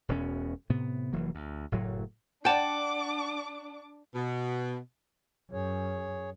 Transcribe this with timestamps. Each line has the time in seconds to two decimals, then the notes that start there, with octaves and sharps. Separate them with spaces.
0.09 E1 E2 B2 C#4
0.69 A2 C3 B3
1.13 F1 E3 F#3 A#3
1.35 D2
1.72 F#1 A2 F#3
2.45 D4 D5 F#5 G5 A5 D6
4.14 B2
5.52 F#2 G#4 C#5